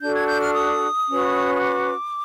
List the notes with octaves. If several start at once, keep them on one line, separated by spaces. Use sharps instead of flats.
D4 F#4 A4 G6
G#6
G6
F6
D#6
C#4 F#4 B4
D#6
D6